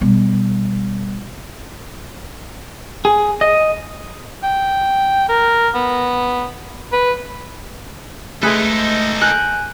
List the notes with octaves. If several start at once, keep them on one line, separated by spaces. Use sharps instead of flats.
B2 G3
G#4
D#5
G5
A#4
B3
B4
G#3 A3 D#4 G#4 A4 B4
A#4 G#5 F#6 G6